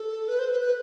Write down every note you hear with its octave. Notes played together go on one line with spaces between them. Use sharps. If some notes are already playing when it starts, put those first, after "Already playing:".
Already playing: A4
B4
C5
B4
B4